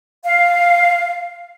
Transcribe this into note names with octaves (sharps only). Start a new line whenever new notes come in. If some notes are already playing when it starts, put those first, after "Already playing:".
F5